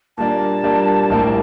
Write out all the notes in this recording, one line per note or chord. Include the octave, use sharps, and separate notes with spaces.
A#2 G3 A#3 D4 A5
A#2 G3 A#3 D4
A#1 A2 G3 A#3